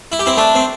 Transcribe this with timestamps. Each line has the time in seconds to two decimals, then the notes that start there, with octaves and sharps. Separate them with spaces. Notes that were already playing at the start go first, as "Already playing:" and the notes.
0.12 E4
0.19 G4
0.26 C4 E4
0.37 A3 D4
0.55 C4